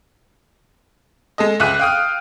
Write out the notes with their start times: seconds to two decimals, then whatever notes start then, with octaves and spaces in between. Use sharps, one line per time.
1.38 G#3 A4 D#5
1.60 C#2 G#4 E5 D6 F#6 D#7
1.79 F5 G5 D#6 F6